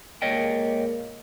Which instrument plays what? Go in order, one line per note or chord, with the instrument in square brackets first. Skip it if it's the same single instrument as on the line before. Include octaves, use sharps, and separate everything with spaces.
[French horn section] A#2 G#3 A#3 [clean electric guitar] C#5 D#5 G5